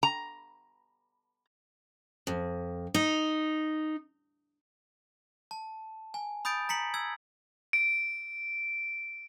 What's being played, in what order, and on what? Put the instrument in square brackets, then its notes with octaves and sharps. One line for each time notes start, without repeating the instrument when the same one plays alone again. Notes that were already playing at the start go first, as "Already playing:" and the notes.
[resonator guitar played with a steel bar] A#5
[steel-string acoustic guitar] F2
D#4
[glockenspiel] A5
G#5
B5 D#6 G6 A6 D7
A#5 B6 C#7 F#7
E6 G#6
[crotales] D7